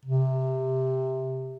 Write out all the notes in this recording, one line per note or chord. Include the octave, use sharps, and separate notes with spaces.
C3